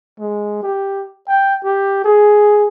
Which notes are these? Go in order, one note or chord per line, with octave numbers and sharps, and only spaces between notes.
G#3
G4
G5
G4
G#4